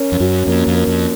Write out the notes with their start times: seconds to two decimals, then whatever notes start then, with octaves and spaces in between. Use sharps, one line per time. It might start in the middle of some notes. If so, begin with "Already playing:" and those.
Already playing: C#4 A#4
0.12 F2
0.20 F#2 F#4
0.47 F2 A#3
0.67 F2
0.73 A#4
0.87 F2